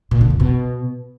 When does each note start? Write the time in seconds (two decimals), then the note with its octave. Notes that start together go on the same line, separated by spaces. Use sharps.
0.11 A#2
0.21 D3
0.30 F2
0.40 B2